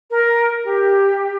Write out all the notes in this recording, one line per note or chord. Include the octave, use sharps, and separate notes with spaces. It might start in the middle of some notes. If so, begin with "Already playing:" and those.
A#4
G4